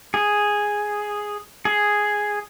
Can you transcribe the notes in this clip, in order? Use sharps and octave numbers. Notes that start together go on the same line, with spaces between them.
G#4
G#4